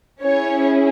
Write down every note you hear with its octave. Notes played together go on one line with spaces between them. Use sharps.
C#4 E4 G#4 C#5